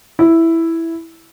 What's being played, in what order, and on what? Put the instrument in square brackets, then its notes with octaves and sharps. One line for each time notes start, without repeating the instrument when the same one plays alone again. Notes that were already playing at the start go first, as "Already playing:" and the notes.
[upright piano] E4